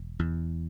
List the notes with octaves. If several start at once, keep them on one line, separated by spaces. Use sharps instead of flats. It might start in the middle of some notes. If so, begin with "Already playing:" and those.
Already playing: E1
E2